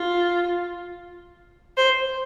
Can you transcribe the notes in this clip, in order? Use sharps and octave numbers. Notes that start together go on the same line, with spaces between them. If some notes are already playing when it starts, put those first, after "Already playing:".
Already playing: F4
C5